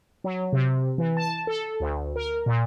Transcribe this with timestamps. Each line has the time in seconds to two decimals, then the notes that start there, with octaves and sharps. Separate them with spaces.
0.24 F#3
0.53 C3
0.98 E3
1.17 A5
1.47 A4
1.80 D2
2.16 A#4
2.46 A#2